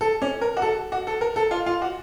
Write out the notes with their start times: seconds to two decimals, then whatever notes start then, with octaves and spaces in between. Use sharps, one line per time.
0.01 A4
0.22 C#4
0.41 A#4
0.57 F#4
0.62 A4
0.92 F#4
1.07 A4
1.21 A#4
1.36 A4
1.51 F4
1.66 F4
1.82 F#4